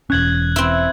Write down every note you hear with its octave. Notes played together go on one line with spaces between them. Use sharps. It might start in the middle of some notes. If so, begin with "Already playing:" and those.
E1 C#4 F#6 G#6 F#7
C4 E4